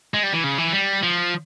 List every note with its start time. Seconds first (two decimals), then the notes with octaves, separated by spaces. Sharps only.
0.14 G#3
0.23 G3
0.33 E3
0.44 C#3
0.58 E3
0.72 G3
1.03 F3